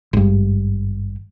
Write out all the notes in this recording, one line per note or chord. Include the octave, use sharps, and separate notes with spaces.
G#1 G2